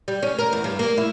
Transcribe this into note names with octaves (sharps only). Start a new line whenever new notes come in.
G3
C#4
A#4
E2
G2
A#3
E4